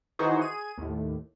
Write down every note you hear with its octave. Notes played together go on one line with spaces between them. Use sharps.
D#3 E3 D#4 F#4 G#4 C5
G#4 D#7
D#2 A2